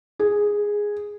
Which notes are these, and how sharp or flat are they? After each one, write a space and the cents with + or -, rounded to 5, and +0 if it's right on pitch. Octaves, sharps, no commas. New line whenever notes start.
G#4 -5